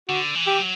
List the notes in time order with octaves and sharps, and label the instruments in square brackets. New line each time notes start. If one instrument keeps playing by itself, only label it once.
[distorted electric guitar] D3 [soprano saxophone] F#4
[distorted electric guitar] E3
[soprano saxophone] G4
[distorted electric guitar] F#3